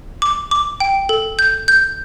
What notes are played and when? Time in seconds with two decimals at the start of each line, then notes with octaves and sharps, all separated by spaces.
0.22 D6
0.51 D6
0.80 G5
1.09 A4
1.39 G6
1.68 G6